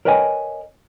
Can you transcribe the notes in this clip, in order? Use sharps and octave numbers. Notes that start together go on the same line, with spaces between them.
A#4 B4 C#5 D#5 G5 G#5